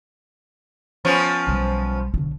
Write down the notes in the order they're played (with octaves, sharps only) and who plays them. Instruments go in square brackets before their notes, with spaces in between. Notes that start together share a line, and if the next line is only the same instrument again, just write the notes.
[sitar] F3 B3 C#4
[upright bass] B1 G3
B1 D3